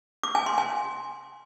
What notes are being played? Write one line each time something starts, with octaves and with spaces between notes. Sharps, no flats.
D6
G#5
C6
G#5